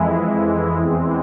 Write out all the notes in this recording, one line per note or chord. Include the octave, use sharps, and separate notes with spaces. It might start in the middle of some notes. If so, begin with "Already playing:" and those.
Already playing: F2 E3 G#3 E4
E2 E3 G#3 C4